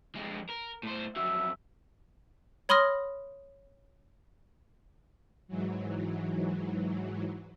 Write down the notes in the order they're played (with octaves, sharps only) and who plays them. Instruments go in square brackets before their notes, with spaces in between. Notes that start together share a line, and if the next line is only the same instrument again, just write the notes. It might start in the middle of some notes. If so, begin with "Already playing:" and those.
[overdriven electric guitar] F2 G#3
A#4
A2 C5
[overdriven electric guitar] F2 F#3 [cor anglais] E5
[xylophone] C#5 B5 C6 D#6 F6 A#6
[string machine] G#2 E3 F#3